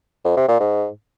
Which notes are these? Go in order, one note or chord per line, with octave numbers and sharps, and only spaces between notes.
F2
C3
A#2
G#2